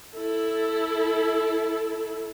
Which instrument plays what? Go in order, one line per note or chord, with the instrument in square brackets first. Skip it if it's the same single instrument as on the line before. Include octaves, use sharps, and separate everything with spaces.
[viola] E4 A4